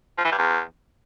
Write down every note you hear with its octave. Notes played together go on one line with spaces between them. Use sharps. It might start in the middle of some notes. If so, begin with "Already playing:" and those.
F3
E3
G2
E2